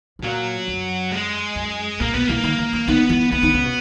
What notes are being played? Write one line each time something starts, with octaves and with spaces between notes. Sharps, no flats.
G#2
A#2 F#3
F#2
G#3
F#2
A#2 A#3
B2 B3
E3 A#3
D#3
E3
E3
D#3 B3
E3
D#3 B3
D#3
C#3
B2